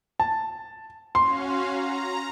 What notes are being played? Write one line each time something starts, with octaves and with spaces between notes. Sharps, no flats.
A5
C#4 F#4 F5 C6
A#5